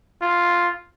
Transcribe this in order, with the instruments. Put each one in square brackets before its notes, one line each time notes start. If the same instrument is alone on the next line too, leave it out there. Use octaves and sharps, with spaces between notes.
[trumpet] F4